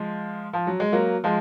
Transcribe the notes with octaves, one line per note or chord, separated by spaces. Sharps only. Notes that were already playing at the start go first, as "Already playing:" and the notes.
Already playing: F3 G#3
F3
F#3
G#3
F#3 A#3
F3 G#3